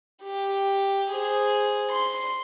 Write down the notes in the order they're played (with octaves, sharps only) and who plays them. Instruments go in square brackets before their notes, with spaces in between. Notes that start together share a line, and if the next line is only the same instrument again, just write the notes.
[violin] G4
G#4 C5
C6